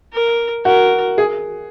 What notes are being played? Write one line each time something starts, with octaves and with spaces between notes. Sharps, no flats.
A#4
F#4 A#4
G#4